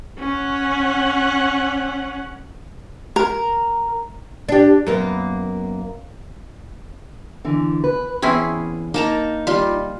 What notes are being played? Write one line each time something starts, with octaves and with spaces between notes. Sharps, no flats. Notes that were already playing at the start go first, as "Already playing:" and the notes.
C#4 F#5
A#4
D4 G4
F#2 A#3 B3
D3 E3
B4
E2 C4 C#4 E4 G#4
A#3 D#4 A5 A#5
G3 F4